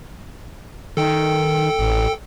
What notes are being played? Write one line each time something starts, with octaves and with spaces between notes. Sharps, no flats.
D#3 A4 G5
A1